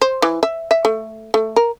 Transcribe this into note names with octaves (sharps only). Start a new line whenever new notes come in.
C5
E3
E5
E5
A3
A3
A#4